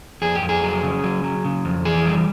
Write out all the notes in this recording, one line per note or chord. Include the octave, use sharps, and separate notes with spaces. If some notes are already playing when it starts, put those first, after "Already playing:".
F2 G#4
G4
F2
G#4
F#3
C#3
F#3
F#3
C#3
F2
E3 G#4
G3